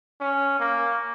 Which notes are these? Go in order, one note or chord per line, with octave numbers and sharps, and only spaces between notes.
C#4
A#3